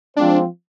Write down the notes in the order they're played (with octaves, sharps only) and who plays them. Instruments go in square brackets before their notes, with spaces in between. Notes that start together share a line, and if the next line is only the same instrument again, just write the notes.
[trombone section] F3 G#3 C4 F4 C5 [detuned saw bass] D4